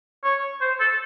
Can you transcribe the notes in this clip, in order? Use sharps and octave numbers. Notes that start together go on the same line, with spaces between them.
C#5
C5
A4